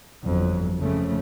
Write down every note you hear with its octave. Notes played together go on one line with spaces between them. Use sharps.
G1 F2 F#3
F2 C#3 A3